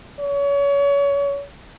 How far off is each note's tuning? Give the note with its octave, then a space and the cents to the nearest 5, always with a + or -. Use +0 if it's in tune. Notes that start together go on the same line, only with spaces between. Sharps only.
C#5 +30